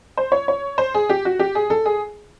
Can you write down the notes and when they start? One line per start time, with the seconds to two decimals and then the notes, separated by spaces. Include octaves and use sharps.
0.17 C5
0.32 C#5
0.48 C#5
0.78 C5
0.94 G#4
1.09 G4
1.25 F#4
1.39 G4
1.55 G#4
1.70 A4
1.86 G#4